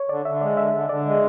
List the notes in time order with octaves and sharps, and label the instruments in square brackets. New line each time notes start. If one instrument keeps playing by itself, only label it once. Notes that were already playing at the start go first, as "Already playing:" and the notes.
Already playing: [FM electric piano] C#5
[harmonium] D3 [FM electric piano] D5
[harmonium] D3 [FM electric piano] E5
[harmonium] G#3 [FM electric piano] D5
[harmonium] D3 [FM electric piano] E5
[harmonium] D3
[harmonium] D3 [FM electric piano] D5
[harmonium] G#3